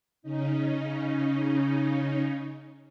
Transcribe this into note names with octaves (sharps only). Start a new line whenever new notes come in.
C#3 C#4 D#4